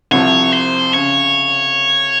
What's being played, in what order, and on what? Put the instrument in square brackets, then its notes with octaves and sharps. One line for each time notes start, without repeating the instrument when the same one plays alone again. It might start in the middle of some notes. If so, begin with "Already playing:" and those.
[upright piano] C2 C3 F3 [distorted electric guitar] C#5
[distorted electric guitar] C5
[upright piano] C#3 [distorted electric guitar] C#5